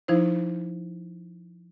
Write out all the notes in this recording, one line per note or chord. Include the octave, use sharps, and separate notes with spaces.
F3 D#4 E4 C5